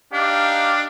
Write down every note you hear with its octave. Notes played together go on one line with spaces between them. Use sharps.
D4 D#4 G4 F5